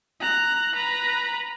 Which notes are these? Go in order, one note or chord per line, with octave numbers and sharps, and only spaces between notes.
A#5 F#6
B4 A#5